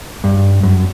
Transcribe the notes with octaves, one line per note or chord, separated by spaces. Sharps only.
G2
F#2